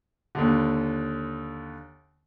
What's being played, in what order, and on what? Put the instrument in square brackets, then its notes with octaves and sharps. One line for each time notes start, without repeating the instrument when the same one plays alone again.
[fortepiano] D#2 D3